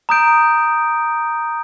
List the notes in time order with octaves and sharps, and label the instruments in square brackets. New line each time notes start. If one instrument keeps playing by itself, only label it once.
[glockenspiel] A#5 D#6 G6 D7